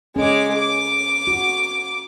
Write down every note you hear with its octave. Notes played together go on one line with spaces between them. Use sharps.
G#3 C#4 D6
D6
F#4